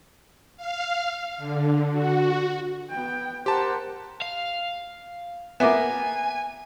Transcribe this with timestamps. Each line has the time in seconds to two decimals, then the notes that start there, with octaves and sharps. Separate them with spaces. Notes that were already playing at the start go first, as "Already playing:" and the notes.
0.57 F5
1.38 D3
1.91 F#4
2.90 B3 G5
3.46 G4 A#4 C5 F#5 A5
4.22 F5
5.60 A#3 B3 E5 G#5 D6